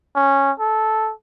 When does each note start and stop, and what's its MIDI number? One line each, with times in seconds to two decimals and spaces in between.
0.16 0.52 61
0.60 1.12 69